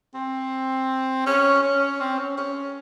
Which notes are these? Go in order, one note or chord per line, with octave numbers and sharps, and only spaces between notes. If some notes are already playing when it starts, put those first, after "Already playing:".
C4
C#4
C#4
C4
C#4
C#4